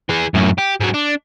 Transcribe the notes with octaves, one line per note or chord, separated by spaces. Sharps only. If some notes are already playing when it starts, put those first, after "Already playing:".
E3 G#4
F#2 A2
G4
G#2 F#3
D4